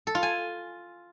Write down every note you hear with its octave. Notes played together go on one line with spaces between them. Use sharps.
A4
F4
G#5